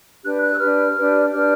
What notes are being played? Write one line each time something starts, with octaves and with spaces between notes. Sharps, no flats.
D4 G4 B4 F#6
F#6
E6
D4 G4 B4 F6
D4 G4 B4
D4 G4 B4 F6